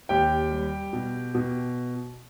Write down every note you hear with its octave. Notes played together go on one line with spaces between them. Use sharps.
D#2 G4 G5
G3
B2
B2